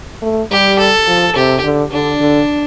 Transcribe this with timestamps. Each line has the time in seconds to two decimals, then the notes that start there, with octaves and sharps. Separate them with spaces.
0.22 A3
0.51 G3 G4
0.79 A4
1.07 F3
1.35 C3 G4
1.64 D3
1.91 D3 D4
2.20 D3